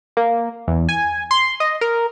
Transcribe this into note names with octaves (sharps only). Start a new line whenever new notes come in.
A#3
E2
G#5
C6
D#5
A#4